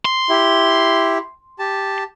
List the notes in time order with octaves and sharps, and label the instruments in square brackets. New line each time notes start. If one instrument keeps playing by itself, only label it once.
[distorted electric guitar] C6
[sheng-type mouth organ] E4 G4
G4 A5